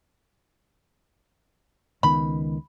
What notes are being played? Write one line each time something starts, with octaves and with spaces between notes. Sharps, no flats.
C#2 D#3 B3 B5